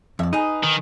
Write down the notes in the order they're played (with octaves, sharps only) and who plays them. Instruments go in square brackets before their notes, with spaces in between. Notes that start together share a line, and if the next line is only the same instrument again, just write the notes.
[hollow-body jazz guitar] F2 [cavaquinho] D5 E5
[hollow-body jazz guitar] D#4 [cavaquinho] G#4 B4
[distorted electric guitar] D#3